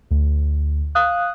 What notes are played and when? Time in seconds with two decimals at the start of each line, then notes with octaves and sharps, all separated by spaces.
0.11 D2
0.95 F5 D#6 F#6